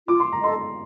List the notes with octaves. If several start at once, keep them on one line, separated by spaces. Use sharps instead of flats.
F4 D6
C6
A#5
A4 D#5 C6